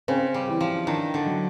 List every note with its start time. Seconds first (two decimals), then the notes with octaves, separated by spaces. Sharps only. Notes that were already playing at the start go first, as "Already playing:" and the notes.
0.08 C#3 C4
0.34 G3
0.48 E3
0.61 F3
0.87 D#3 D4
1.14 D3
1.26 F#3